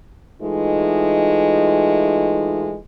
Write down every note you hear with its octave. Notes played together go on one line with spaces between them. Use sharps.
E3 G#3 A3 D#4 F4